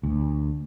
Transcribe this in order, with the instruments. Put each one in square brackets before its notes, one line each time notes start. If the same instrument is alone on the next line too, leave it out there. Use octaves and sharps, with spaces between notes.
[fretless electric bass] D2